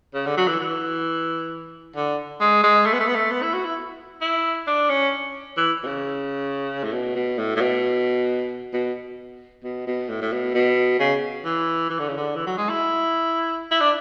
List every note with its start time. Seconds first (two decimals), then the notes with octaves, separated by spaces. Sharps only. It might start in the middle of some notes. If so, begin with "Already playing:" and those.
0.14 C#3
0.26 D3
0.37 F#3
0.48 E3
0.60 E3
1.96 D3
2.41 G#3
2.63 G#3
2.86 A3
2.93 B3
3.00 A3
3.07 B3
3.15 A3
3.31 B3
3.42 E4
3.54 F#4
3.65 E4
4.21 E4
4.67 D4
4.90 C#4
5.57 E3
5.83 B2
5.87 C#3
6.84 A2
6.93 B2
7.15 B2
7.38 A2
7.56 A2
7.61 B2
8.73 B2
9.64 B2
9.87 B2
10.09 A2
10.22 A2
10.32 B2
10.54 B2
11.00 C#3
11.45 E3
11.90 E3
11.99 D3
12.08 C#3
12.17 D3
12.35 E3
12.47 F#3
12.58 G#3
12.69 E4
13.71 E4
13.80 D4